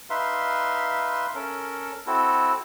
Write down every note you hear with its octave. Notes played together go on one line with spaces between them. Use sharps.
D#4 B4 E5 F5 C6
C#4 A4 A#4
C4 E4 F#4 A4